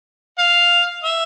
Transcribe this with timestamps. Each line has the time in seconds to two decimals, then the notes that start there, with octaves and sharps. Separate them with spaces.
0.39 F5
1.04 E5